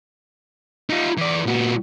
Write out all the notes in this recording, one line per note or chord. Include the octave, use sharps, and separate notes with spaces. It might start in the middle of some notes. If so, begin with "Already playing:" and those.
D#4 F4
E3 D5
A#2 F#4